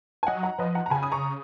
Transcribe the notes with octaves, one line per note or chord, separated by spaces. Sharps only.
G#5
F#3 D#5 F#5
F#5 A#5
F3 B4 D#5
F#5 A#5
A#5
C#3 G#5 B5
D#6
A#5 C#6